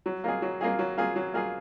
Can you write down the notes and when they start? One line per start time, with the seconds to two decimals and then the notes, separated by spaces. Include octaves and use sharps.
0.06 F#3
0.24 A#3 F4 G#4
0.42 F#3
0.61 A#3 F4 G#4
0.79 F#3
0.97 A#3 F4 G#4
1.16 F#3
1.33 A#3 F4 G#4